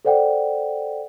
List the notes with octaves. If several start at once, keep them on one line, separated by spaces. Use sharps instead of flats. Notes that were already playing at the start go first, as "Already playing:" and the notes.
A4 C5 D5 F#5 G5